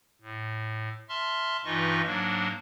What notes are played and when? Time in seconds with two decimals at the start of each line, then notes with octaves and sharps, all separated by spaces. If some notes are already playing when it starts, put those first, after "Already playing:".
0.21 A2
1.09 E5 A5 C6 F6
1.65 G2 E3 D#4 F4 D#5 C#6
2.05 G#2 F#3 A#3 D4